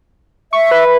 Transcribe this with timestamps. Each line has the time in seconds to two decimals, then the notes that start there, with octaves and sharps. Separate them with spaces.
0.53 E5 C#6
0.71 B4